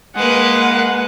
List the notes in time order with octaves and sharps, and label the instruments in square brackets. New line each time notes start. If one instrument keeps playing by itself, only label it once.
[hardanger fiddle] G#3 B4 [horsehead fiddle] A#3 F#5